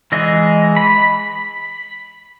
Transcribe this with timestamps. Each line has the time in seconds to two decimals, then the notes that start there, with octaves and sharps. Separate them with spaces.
0.12 E3 G#3 D#5
0.77 B5